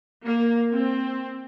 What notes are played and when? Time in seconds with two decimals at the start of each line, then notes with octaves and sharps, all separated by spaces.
0.25 A#3
0.73 C4